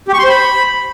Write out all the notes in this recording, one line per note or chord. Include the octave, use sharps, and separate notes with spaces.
G4
C#6
C6
C5
B5